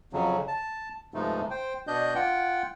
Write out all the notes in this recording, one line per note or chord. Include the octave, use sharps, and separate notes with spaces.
F2 C#3 F#3
A5
G2 C3 F3 G#3 A3 D#4
C5 G5
B2 D4 D#5 G6
F4 F#5 G5